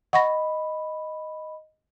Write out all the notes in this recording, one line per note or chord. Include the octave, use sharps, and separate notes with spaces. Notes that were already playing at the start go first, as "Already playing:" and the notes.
D#5 F#5 B5 C#6 A#6